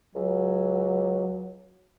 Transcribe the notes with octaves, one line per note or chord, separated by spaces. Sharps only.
C#2 F#3